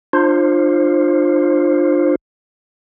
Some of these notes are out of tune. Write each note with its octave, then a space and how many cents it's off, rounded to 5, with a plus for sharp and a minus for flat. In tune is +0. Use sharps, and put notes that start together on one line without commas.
D4 +30 F4 +0 C5 +20